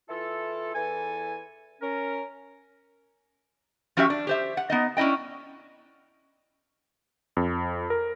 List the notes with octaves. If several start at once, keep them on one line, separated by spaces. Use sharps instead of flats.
E3 E4 F4 A4
E2 E3 A4 G#5
C#4 A#4
F3 C#4 F#4 G4 A#4 E5
D4
G4 C5 E5
F#5
B3 D#4 D#5
C#4 D4 E4 D#5 G5
F2
A#4